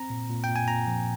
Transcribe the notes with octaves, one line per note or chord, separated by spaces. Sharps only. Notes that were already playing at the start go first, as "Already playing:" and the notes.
Already playing: C4 A#5
A#2
A#2
A#2 G5
G#5
A#2 A#5
F3